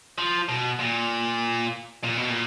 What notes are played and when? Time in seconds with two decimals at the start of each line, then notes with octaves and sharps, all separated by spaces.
0.18 F3
0.49 B2
0.80 A#2
2.04 A#2
2.17 B2
2.30 A#2